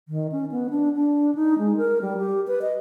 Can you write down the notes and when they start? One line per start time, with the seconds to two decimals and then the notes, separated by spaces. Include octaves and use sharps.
0.08 D#3
0.32 C#4
0.52 B3
0.70 D4
0.94 D4
1.35 D#4
1.59 G#3
1.77 A#4
2.01 G3
2.18 G4
2.47 B4
2.62 D#5